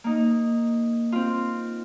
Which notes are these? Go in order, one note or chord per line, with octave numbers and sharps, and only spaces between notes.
A#3 D#4
C4 F4